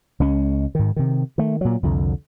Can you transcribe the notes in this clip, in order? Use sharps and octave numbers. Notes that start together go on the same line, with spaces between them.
C#2 G#3 C#4
G#2 D#3
C3 D#3
D#3 A3
A#2 F#3
C2 F2 D3